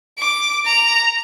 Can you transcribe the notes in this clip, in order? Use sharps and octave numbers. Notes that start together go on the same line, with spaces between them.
D6
A#5